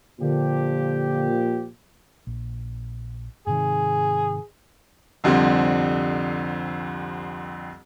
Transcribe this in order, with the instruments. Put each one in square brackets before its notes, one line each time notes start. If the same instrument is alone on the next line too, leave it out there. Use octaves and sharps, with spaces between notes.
[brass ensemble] A#2 F3 G4 [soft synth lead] D3
[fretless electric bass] A#1
[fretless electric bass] G#2 C3 D#3 [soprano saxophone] G#4
[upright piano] C2 F2 D3 G3 C4